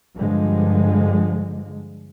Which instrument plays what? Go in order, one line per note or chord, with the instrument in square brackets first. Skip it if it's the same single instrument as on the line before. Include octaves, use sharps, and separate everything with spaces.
[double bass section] G2 D3 F3 G#3